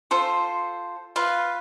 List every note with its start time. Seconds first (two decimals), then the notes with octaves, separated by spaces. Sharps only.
0.11 F4 A4 C5
1.16 F4 B4 F5